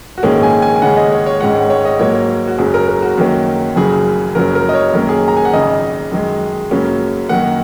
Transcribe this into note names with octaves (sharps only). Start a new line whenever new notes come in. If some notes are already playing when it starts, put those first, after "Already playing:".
F#4
A#1 G#2 D#3 A#3 C#4 G#4
G#5
G#5
G#5
D#2 C#3 G#3 C#4 F#5
D#5
C#5
C#5
G#1 G#2 D#3 G#3 C#4 F#5
F#5
C#5
D#5
G#2 F#3 A#3 C#5
F#4
F#1 F#2 F#3 C#4 G#4
A#4
A#4
F#4
F#2 D#3 A#3 C#4
F#1 F#2 C#3 F#3 G#4
F#1 F#2 F#3 C#4 A#4
A#4
D#5
C#5
F#2 D#3 A#3 C#4 A#4
G#4
A#5
G#5
F#5
G#1 F#2 C#3 D#5
F#2 D#3 G#3
F#2 C#3 F#3 A#3 C#4
F#2 D#3 A#3 F#5